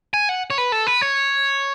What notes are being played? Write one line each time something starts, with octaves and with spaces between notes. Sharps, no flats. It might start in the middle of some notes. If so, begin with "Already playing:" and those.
G#5
F#5
C#5
B4
A4
B4
C#5